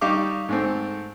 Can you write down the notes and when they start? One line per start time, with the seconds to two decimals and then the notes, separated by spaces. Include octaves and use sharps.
0.01 G3 D#4 G4 F5 C#6 D6
0.49 G#2 A3 C4